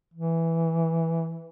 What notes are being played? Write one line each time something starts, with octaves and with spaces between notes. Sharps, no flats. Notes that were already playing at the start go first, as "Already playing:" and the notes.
E3